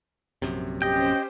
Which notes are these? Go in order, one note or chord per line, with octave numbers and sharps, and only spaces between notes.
A#1 F#2 C3
C#4 G4 C5 D#5 G5